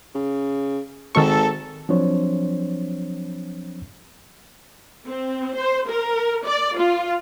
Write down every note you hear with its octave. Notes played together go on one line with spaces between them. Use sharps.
C#3
G#1 D#3 A4 C#6
F3 F#3 C4 D4 C5 C#5
C4
C5
A#4
D5
F4